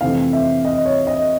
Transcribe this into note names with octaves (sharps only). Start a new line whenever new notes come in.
F2 C3 E3 A3 C4 F5
E5
D#5
C#5
D#5